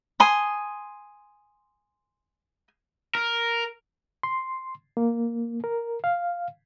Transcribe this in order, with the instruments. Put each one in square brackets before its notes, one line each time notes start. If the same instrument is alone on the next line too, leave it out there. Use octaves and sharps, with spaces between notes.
[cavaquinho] G#5 C6 D#6
[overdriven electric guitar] A#4
[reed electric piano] C6
A#3
A#4
F5